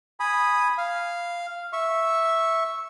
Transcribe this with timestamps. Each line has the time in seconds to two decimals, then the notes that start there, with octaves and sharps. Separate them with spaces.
0.20 G#5 B5 D#6
0.78 F5
1.73 E5 C#6